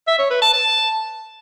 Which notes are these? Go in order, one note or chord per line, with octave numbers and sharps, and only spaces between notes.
E5
C#5
B4
A5
A5